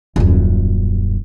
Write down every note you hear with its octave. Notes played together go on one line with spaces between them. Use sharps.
D#1 F#2